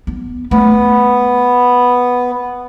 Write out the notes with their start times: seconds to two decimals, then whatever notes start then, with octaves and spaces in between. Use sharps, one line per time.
0.07 B3
0.51 A3 B3